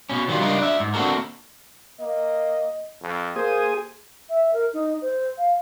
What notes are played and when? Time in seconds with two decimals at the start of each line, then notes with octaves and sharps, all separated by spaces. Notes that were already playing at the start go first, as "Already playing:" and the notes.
0.10 B2 C#4
0.28 D#3 F#3 G3 B3 F4
0.40 C#2 G3 D4 F4 A#4 D#5
0.59 D4 E5
0.80 G#2
0.94 A#3 C4 D4 F#4 A4 A#4
2.00 A#3 D#5
3.02 F2
3.36 A#3 G#4 C5 G#5 D#6
4.30 E5
4.53 A#4
4.73 D#4
5.02 C5
5.38 F5